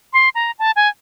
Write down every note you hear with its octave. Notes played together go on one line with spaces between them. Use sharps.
C6
A#5
A5
G#5